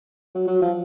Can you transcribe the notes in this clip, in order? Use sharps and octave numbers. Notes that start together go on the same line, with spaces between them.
F#3
F#3
F3